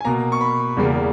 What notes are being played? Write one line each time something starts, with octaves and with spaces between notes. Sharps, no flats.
G#5
B2 A#3 A#5
C#6
B5
E2 C#3 G3 A#3